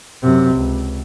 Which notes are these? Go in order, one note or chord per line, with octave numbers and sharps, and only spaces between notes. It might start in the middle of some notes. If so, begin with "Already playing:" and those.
F#2 C3
C#2